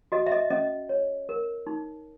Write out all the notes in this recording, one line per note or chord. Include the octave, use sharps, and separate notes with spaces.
F#4 D#5
E5
D#5
C#4 D#5
C#5
A#4
D#4